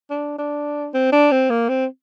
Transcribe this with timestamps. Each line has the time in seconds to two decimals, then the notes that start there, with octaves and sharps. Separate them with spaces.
0.10 D4
0.38 D4
0.94 C4
1.12 D4
1.32 C4
1.50 A#3
1.69 C4